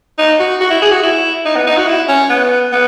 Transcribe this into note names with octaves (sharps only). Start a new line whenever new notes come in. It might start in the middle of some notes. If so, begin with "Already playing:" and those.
D#4
F#4
F#4
E4
G#4
F#4
E4
D#4
B3
D#4
F#4
E4
C#4
B3
B3